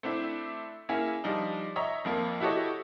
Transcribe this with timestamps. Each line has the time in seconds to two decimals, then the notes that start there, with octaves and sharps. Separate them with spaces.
0.03 A3 C4 D4 E4
0.89 A#3 C#4 E4 G#4
1.24 F3 G3 D4 D#4
1.76 C#5 D#5 E5 A#5
2.05 F2 F3 A#3
2.40 E4 F#4 G4 A4 C#5 D#5